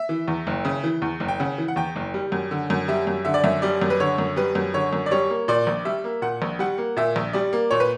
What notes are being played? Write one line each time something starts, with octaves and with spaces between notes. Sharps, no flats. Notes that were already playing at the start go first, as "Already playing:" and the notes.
Already playing: E5
E3
E2
F#1
C#3
E3
E2
F#1
G5
C#3 F#5
E3
F#5
E2 G5
F#1
G3
F#2
D3
F#2
G3 E5
F#2
D3 E5
D5
F#2 E5
G3 D5
F#2
B4
D3 C#5
F#2
G3 B4
F#2
D3 C#5
F#2
D5
G3 C#5
A#3
A#2 D5
A#1
G3 E5
A#3
A#2 F#5
A#1
G3 F#5
A#3
A#2 E5
A#1
G3 D5
A#3
A#2 C#5
B4